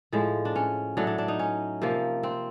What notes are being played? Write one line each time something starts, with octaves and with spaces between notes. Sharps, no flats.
A2 F3 G#3
D4
C#4
A2 F#3 A3 D4
D4
D4
D#4
C#4
C3 F3 A#3
C4